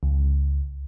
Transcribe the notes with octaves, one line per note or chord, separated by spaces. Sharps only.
C#2